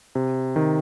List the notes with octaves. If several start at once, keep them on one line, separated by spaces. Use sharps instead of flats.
C3
D#3